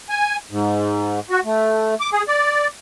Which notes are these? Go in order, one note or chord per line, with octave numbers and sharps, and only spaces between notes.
G#5
G#2
F#4
A3
D6
G#4
D5